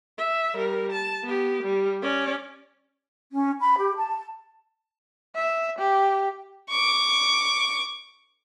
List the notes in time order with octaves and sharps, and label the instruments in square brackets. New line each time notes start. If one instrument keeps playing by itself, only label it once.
[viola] E5
G3 A#4
A5
B3 G4
G3
C#4 D5
[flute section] C#4
B5
G4
A5
[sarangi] E5
G4
[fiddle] C#6 D6